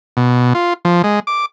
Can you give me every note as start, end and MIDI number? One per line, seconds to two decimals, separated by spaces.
0.17 0.53 47
0.55 0.74 65
0.85 1.02 53
1.04 1.20 56
1.27 1.46 86